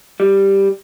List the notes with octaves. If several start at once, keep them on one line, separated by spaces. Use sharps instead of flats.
G3